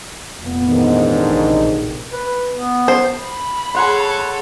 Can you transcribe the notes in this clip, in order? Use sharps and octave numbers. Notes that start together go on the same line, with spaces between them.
F1 A#2 B3
A1 G#2 D#3 D4
A#1 A2 C3
B4
B3
C5
B5
G#4 A4 C#5 F#5 C6